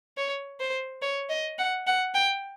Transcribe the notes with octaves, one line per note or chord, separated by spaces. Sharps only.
C#5
C5
C#5
D#5
F#5
F#5
G5